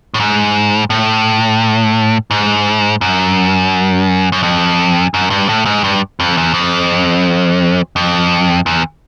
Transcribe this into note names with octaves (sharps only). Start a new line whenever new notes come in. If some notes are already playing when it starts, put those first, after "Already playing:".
A2
G#2
A2
G#2
F#2
F#2
F2
F#2
G2
A2
G#2
G2
F2
E2
F2
F2
E2